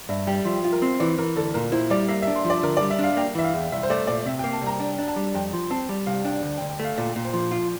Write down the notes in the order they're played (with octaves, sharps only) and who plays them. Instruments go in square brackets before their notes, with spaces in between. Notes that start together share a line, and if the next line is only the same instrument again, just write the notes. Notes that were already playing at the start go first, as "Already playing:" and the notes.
[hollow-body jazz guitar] G2 [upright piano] E5
[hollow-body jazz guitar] G3 [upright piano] G5
[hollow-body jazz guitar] F3 [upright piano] E5
[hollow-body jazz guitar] F4
[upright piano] A#4
[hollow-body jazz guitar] C4
[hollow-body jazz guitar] E3 [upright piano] D5
[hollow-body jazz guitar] E3 [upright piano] A#4
[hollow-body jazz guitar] D2 [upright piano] A4
[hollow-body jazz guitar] A#2 [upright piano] A#4
[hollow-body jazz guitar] E4 [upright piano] C5
[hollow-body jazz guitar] G3 [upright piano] D5
[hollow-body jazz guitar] A#3 [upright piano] E5
[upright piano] E5
[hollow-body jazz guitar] D4
[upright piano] C6
[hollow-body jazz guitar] F3
[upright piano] D5
[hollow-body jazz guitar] D3 [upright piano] A#4
[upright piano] D5
[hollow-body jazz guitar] G3
[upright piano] E5
[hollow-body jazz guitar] D4 [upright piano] F5
[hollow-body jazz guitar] A#3 [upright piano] G5
[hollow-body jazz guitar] E3 [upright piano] E5
[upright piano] F5
[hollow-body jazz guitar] E2
[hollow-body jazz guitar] C2 [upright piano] E5
[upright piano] C5
[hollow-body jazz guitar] A3 [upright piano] D5
[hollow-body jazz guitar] A#2 [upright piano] D5
[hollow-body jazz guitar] C3 [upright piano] E5
[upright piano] G5
[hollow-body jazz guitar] A#3
[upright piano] A5
[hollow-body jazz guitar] C2 [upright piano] A#5
[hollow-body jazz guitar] D4
D4
[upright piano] A5
[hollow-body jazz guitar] G3
[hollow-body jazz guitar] F2 [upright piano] G5
[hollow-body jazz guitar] F3
[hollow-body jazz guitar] C4 [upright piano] A5
[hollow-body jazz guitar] G3
[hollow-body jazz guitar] C2 [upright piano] F5
[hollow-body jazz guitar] D4 [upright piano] G5
[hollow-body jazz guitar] D2
[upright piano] G5
[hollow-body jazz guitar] D2
[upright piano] G5
[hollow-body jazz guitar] A3
[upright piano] F5
[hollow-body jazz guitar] A#2 [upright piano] D5
[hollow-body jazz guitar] A#2
[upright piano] C5
[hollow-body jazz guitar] F3
F4